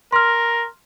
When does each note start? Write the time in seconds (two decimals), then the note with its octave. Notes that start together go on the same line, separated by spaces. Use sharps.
0.13 A#4 C6 F6